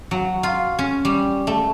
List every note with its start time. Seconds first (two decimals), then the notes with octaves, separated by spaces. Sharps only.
0.11 F#3
0.43 F4
0.79 C#4
1.05 G3
1.47 A3